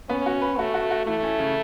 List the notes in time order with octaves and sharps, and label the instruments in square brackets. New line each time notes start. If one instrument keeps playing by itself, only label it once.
[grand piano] B3 [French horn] C#4
[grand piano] F#4
B4
[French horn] A3 [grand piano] F#4
[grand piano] F#4
F#4
[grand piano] E3 [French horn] A3
[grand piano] C#4
C#3